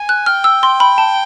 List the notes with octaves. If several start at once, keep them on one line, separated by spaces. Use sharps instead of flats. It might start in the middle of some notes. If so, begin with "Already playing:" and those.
Already playing: G#5
F#6
G5 F6
E6
C6
B5
A5